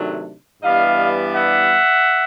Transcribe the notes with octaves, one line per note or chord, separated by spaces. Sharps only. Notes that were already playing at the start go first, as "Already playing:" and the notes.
Already playing: C3 D#3 F#3 A3 D4
G2 E3 G3 B3 D#5 F5
E5 F#5